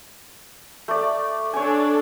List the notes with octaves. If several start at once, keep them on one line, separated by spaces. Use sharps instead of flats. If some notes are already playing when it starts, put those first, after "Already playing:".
A3 D5
D4 A4 C#5 G#5